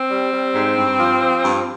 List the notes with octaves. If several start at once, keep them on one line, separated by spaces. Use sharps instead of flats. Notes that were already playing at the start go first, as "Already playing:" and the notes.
Already playing: C4
G3
G3
G#2
G2
F3
F3
G2